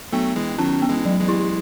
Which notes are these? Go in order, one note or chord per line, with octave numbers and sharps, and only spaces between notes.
F#3 A3 B3
E3 G#3
D#3 F#3 C#4
B3
E3 G#3
F#3
E3 G#3
E4